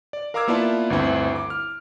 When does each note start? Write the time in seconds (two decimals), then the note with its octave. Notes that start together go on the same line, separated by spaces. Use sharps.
0.13 D5
0.34 A#4 F5 A#5 D6 E6 G#6
0.48 A#3 B3 E4 F4 D5 A5
0.90 G1 D2 C4 E4
1.36 D6
1.50 F6